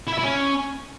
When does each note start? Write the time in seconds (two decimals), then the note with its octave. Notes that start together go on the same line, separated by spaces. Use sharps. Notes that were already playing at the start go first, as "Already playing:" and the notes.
0.07 E4
0.13 E5
0.18 E4
0.23 C#4